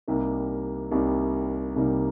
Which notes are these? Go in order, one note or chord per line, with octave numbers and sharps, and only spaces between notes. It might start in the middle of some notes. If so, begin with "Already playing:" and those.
C2 C3 G3 A#3 D#4
C2 C3 G3 A#3 D#4
C2 C3 G3 A#3 D#4